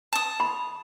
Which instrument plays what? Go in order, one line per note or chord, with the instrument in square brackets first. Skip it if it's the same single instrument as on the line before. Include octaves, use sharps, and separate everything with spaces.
[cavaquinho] A5 D#6
[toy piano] B5